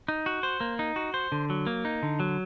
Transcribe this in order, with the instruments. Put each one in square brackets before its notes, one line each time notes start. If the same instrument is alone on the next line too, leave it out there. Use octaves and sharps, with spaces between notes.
[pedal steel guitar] D#4
F#4
C5
A#3
D#4
F#4
C5
D3
F#3
A#3
D#4
D3
F#3